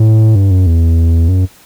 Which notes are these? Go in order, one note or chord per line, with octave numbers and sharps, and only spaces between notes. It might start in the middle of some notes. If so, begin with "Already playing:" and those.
Already playing: A2
G2
F#2
E2
F#2